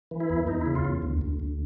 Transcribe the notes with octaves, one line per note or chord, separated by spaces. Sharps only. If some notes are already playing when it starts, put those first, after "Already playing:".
E3
E4
E2
E2 D#4
C#3 E4
F4
E2
D2
D2
D2